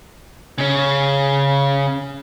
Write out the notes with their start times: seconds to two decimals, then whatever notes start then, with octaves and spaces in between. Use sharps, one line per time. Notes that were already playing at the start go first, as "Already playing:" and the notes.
0.58 C#3 C#4